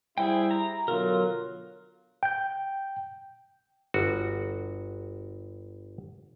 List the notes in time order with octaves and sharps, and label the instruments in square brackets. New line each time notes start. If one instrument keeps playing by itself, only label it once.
[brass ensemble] G3 E4 [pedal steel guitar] G#4 C5 G5
[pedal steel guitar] A#5
[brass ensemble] B2 D3 F4 [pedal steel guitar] F#3 A#4
[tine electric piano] G5 G6
[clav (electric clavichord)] G1 F#4